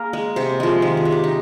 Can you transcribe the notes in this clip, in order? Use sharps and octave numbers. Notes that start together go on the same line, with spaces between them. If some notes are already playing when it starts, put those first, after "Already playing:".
Already playing: A#3 G#4 A#4
G#3
C3 C5
F3 G#3
D#3 C5
G#4
G#3
G4
D#4